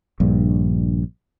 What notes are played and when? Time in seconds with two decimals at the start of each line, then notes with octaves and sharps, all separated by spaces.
0.20 A#1 G2